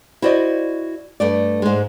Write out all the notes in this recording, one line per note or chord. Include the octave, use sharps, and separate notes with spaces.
E4 F#4 C5 D5 D#5
G2 A3 D5
G#2 G#3